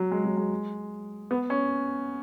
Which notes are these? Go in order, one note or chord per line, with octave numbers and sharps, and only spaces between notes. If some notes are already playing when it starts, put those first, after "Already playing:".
Already playing: F#3
G#3
F#3
G#3
B3
C#4